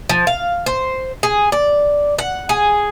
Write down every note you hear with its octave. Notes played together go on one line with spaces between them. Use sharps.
F3
F5
C5
G#4
D5
F#5
G#4